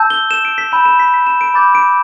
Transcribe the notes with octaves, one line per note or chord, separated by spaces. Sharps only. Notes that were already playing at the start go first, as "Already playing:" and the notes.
Already playing: A5 E6 G6
G7
E7
D7
B6
B5 E6 G6 E7
E7
B6
B6
E7
D7
B5 D6 G6 A6
D7